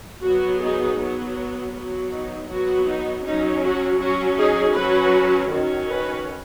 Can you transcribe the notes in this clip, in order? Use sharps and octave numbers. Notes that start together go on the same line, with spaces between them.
F#3 B3 F#4
D#4 G#4
F#3 B3
F#3 B3
D#4
F#3 B3 F#4
D#4
F#3 C#4 D#4
F#4
F#3 C#4 F#4
D#4 G#4
F#3 C#4 F#4 B4
D#3 F#3 C#4
F#4 B4